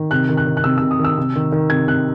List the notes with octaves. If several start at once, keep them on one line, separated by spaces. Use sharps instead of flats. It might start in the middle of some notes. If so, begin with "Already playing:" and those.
Already playing: D#3
C3 F#6
D#3
F#6
D#3
F#6
C3 E6
C3 E6
D#6
D#3
E6
C3
D#3
D#3
C3 G#6
C3 F#6